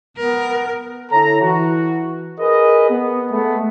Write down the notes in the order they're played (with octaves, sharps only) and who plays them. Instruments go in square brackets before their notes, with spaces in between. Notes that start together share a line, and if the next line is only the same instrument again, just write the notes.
[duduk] B3 [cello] A#4
[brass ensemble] D3 E4 A4 C#5 A#5
E3 F#4
G#4 A#4 B4 D#5
B3
G#3 A3 B3